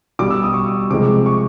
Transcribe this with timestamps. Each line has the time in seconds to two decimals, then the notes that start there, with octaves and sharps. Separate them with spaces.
0.19 B2 G3 D6
0.30 E6
0.43 D#6
0.54 C#6
0.91 C3 F3 G#3 D6
1.26 C#6